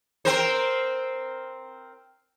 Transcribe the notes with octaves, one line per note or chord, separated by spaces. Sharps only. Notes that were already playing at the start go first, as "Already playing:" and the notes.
C4 A#4 C5